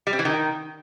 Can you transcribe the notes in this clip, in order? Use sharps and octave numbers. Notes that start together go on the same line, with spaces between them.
G3
C4
E3
D#3